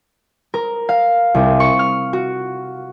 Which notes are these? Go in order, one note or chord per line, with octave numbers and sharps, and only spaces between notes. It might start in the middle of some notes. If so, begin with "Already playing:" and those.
A#4
F5
C2
C#6
F6
F#4